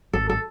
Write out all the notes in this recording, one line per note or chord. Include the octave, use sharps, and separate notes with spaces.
G#1 A4
A4